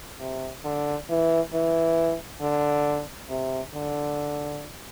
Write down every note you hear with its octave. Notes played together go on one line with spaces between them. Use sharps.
C3
D3
E3
E3
D3
C3
D3